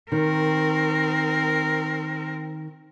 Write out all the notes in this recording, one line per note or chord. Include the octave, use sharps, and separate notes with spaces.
D#3 C4 A#4